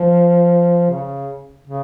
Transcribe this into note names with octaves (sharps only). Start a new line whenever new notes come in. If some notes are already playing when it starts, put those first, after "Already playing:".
Already playing: F3
C#3
C#3